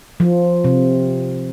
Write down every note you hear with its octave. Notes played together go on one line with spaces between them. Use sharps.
F3
C3